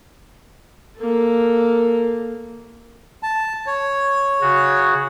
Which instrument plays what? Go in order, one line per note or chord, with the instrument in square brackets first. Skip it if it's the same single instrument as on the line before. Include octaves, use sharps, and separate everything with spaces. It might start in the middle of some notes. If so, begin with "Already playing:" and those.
[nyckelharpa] A#3 A4
[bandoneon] A5
C#5
[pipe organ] C#3 F#4